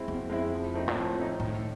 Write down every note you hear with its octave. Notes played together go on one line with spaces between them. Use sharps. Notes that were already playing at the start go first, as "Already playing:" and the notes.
Already playing: G#3 C4 E4
F2 B2
G#3 C4 E4
F3
A3 C4 D#4
A#2
A2 F3
A3 C4 D#4
A2 D#3